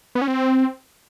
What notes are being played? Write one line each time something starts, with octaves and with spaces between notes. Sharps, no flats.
B3
C#4
C4